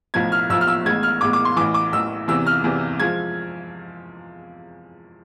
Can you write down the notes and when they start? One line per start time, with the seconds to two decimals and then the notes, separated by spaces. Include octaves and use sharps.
0.14 B1 A2 F3 G#6
0.32 F6
0.50 B1 A2 F3 E6
0.61 F6
0.68 E6
0.85 A1 A2 G#3 B3 G#6
1.03 F6
1.21 A1 A2 G#3 B3 D6
1.33 D6
1.45 C6
1.56 A1 A2 E3 D6
1.74 D6
1.92 A1 A2 E3 E6
2.28 E2 C3 E3 E6
2.47 F6
2.64 E2 C3 E3
3.00 F3 G#3 G#6